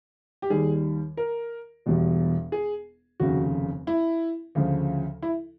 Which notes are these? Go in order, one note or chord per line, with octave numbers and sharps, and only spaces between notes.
G4
D#2 D#3 G3 G#4
A#4
E1 E2 B2 G3
G#4
F1 D#2 C#3 F#4
E4
D2 C#3 F3
E4